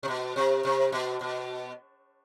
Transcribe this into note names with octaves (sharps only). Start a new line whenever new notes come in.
C3
B2
C3
C3
B2
B2